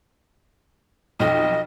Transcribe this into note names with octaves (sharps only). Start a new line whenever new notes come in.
B1 F2 D#5